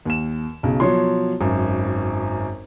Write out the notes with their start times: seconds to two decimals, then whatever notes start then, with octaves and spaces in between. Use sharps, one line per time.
0.05 D#2 E7
0.63 B1 C#3
0.80 B2 F3 F#3 C#5 C6
1.41 G#1 F#2